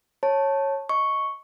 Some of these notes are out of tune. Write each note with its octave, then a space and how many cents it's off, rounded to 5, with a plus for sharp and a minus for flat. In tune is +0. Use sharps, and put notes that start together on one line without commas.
C#5 -15 A5 +0
D#5 +0 C#6 +0